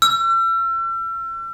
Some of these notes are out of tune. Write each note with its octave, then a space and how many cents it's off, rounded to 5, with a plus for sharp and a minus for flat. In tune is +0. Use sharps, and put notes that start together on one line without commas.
E6 +40